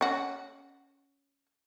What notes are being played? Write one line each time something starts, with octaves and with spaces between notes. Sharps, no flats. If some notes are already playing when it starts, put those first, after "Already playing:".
C#4 F#4